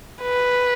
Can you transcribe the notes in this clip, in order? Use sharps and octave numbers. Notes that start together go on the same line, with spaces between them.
B4